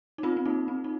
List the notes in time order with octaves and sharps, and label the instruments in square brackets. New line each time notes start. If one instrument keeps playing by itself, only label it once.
[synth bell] D#4
C4 F4
C4
A#3 D#4
C4
D#4